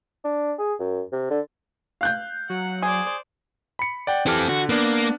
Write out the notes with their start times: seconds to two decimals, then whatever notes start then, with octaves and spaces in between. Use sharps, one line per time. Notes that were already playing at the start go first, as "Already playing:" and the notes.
0.24 D4
0.58 G#4
0.80 F#2
1.12 C3
1.30 D3
2.01 F5 F#6 G6
2.50 F#3 F#5
2.82 G#4 C5 D5
3.79 B5 C#7
4.07 D5 F#5 G5
4.26 E3 C4 G4 A4 F6
4.49 D3 F#4
4.69 A#3 B3 D4